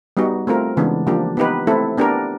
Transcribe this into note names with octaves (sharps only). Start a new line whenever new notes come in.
G3 B3 D#4 F#4
A3 C4 F4 A#4
C#3 E3 G#3 B3 D4
F3 A#3 D4 G4
B3 D#4 G4 B4
A3 C4 E4 A4
B3 D4 G4 A#4